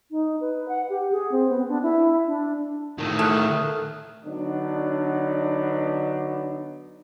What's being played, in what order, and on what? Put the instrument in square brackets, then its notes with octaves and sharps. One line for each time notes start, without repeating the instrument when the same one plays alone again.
[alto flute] D#4
B4
F#5
G4
G#4
C4
B3
D4
E4
D4
[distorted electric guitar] A2 D#3
[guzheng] A3 [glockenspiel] D#6 F6 F#6
[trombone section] D3 F#3 B3 D4 D#4